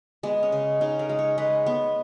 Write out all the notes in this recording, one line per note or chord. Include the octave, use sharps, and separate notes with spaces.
G#3 B3
C#4
C#3
C#3 D#4
A#4
G#3
C#5
G#3 B4
B3